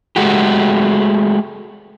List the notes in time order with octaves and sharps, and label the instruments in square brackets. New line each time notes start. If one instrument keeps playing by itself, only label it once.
[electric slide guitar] G#3 A3 F#4 G4